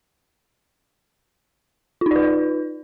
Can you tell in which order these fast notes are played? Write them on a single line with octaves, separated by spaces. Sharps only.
F4 D#4 D5 B4